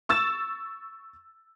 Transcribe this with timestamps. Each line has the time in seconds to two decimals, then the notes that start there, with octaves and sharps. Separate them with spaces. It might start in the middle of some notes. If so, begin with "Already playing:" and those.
0.09 C#6 E6 A6 E7